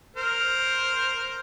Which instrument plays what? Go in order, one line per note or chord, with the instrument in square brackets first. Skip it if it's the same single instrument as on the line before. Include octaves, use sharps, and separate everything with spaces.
[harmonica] A#4 C5